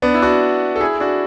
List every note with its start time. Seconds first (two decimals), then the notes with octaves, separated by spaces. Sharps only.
0.02 B3 D4
0.14 E4
0.22 D4 F#4
0.76 A4
0.80 E4 G#4
1.00 D4 F#4